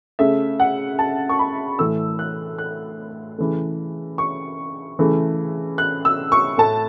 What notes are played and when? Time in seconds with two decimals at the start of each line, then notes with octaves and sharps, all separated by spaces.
0.19 C#3 A3 E5
0.60 F#5
0.99 A5
1.29 C#6
1.39 B5
1.79 A2 E3 A3 E6
2.19 F#6
2.58 F#6
3.38 C#3 E3 A3
4.18 C#6
4.99 C#3 E3 A3
5.78 F#6
6.05 E6
6.32 C#6
6.58 A2 A3 A5